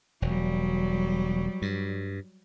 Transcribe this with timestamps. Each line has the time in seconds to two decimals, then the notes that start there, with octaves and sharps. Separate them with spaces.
0.22 E1 F#3 G3
1.62 G2